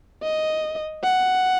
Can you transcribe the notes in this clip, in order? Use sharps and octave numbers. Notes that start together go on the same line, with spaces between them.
D#5
F#5